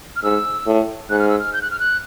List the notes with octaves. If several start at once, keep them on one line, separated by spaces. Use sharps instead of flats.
F6
G#2 E6
A2
G#2 F#6
F6
E6
F6
G6
F#6
F6
F#6